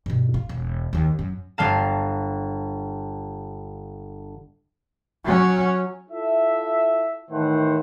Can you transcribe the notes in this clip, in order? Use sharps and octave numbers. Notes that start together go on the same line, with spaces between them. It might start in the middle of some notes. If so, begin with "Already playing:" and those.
G2 B2
F4
E1
D#2 D#3
F#2
G1 G3 F5 A5
F#3 C#4
E4 F4 A4 E5
A2 D#3 E3 A3 C5 F#5